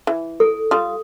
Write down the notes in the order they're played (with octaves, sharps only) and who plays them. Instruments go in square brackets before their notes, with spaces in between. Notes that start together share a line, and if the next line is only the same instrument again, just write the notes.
[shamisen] E3
[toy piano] A4
[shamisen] G3 F4 [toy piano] D#6